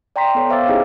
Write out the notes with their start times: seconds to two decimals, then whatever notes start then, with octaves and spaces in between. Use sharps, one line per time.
0.16 D5 G5 A#5 C6 B6
0.35 B3 A4 C#5
0.50 C5 E5 F5 D6 E6 A6
0.68 C#4 D#4 E4 G4 G#4 D#5